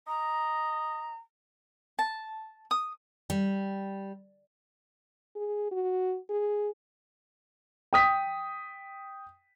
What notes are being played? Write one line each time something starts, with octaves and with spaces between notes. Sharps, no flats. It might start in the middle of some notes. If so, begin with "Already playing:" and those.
D#5 A#5
A5
D#6
G3
G#4
F#4
G#4
G5 D#6 B6